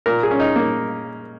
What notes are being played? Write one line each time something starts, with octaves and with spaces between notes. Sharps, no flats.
A#2 A#4
G#4
C#4
D#4
A#3